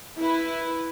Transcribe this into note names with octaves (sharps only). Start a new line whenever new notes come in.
E4 B4